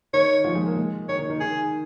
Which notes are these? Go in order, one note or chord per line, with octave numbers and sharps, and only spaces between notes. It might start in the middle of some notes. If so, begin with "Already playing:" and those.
D#3 C#5
F3
G#3
A#3
G#3
D#3 C#5
D#3
D#3
D#3 G#4